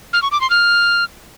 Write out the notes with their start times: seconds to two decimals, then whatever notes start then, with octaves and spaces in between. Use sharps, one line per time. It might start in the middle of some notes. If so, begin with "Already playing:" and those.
0.13 F6
0.22 C#6
0.32 D6
0.41 C6
0.50 F6